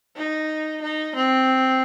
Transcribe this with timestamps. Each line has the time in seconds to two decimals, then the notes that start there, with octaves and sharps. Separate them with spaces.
0.16 D#4
0.82 D#4
1.15 C4